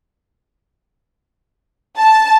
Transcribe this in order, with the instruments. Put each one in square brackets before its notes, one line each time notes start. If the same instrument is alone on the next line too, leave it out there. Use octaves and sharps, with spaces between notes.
[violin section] A5